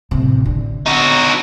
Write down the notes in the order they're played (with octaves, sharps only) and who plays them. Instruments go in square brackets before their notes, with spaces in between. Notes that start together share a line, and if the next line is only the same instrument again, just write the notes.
[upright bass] A1 C3
D3
[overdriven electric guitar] D#4 F#4